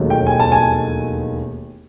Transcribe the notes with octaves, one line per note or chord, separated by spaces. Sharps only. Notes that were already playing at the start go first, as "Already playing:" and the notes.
Already playing: E1 D#2 D#3 F#3 A3
G5
G#5
A5
G#5